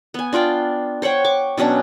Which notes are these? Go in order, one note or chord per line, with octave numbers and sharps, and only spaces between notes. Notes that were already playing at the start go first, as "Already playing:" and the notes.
B3 G#5
D4 F4 D5 G5
C5 C#5 F#5 G5
C#6 D6
B2 F#3 C#4 D4